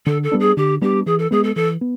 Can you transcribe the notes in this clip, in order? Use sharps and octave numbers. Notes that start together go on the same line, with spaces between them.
D3 A4
A4
G3 B3 D4
G#4
D3 G4
G3 B3 D4 G4
E3 G#4
A4
G#3 B3 G#4
A4
E3 A4
B3